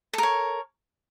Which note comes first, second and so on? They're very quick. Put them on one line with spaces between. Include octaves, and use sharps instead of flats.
A4 A#4 C#5